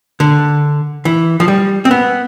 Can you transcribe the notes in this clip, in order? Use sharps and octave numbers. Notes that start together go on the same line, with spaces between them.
D3
E3
F3
G3
C4
B3